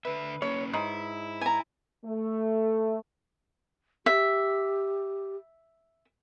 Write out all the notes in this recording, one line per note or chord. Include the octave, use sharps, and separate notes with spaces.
D3 B4 E5
A#3 C#4 C#5
G#2 E4
G#5 A#5
A3
G4 E5